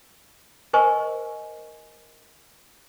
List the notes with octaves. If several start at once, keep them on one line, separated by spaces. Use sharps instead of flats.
A#4 C5 D#5 G#5 C#6